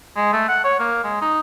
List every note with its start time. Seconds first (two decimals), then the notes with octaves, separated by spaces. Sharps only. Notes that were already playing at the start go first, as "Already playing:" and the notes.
0.16 G#3
0.33 A3
0.48 F#5
0.64 C#5
0.79 A#3
1.04 G#3
1.21 D#4